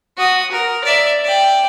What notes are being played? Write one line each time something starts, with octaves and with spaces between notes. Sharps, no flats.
F#4 D#6
A#4
D5 E5
D5 G5